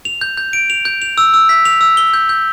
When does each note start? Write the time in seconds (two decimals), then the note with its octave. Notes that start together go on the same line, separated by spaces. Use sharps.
0.05 F7
0.21 G6
0.37 G6
0.53 D7
0.70 F7
0.85 G6
1.02 F7
1.18 E6
1.34 E6
1.49 B6
1.65 F7
1.81 E6
1.97 G7
2.14 G6
2.29 G6